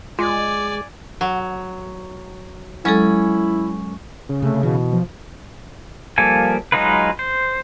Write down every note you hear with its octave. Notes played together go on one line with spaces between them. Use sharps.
G#3 F4 D5 G#5 D6
F#3
F#3 G#3 C#4 E4 A4
C#3
C3 A3
B2 E3
F3
F3 G3 A#3 A4 G#5
F#3 G#3 D#4 F4 B4
C5